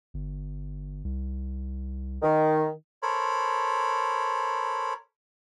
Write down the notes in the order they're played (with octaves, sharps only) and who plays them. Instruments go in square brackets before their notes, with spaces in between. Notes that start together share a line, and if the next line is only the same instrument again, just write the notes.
[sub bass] G1
C2
[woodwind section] D#3
[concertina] A4 A#4 C5 C#5 B5